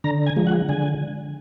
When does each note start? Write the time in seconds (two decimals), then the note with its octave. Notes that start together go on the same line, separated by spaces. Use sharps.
0.04 D3 A#5
0.26 G#5
0.36 F3 G#3
0.47 F#5
0.69 D3 G#5